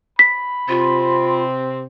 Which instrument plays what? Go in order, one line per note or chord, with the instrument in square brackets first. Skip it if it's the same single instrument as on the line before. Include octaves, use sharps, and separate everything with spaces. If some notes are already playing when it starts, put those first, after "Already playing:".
[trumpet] B5 [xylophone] B6
[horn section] C3 C4 [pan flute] F4